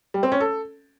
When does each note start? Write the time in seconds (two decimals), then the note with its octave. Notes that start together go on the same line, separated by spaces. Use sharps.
0.14 G3
0.23 C4
0.32 C#4
0.40 A4